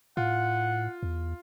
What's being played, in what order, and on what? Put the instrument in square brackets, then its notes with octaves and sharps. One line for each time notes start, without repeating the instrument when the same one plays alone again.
[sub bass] A2 [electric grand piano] F4 [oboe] F#5
[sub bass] E2